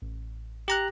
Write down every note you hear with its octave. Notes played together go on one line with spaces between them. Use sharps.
A1
G4 A#5 F#6